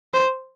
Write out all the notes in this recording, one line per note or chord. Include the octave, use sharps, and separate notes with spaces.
C5